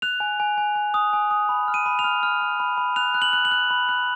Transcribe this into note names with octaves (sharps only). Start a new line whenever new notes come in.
F#6 F7
G#5
G#5
G#5
G#5
D#6
G#5
D#6
B5
F6
D#7
B5
F7
F6
F6
B5
B5
B5
F#6 F7
F#6
F#7
F#6
F#7
F#6
B5
F#6